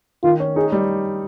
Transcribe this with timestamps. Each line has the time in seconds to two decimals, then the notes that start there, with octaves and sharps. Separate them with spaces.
0.24 D#3 F4
0.40 C#4
0.56 D#4 G#4
0.72 G3